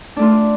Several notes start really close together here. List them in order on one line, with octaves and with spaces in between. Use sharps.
D4 A3 F4